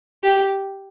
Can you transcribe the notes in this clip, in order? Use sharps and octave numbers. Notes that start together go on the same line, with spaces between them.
G4